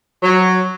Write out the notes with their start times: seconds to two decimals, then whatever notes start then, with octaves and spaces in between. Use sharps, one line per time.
0.23 F#3